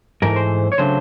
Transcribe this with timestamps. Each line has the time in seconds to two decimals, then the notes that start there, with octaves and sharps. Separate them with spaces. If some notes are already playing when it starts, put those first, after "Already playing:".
0.22 G#2 E3 A3 A#4
0.36 C5
0.72 C#5
0.78 C#3 F#3 A3 D4 C5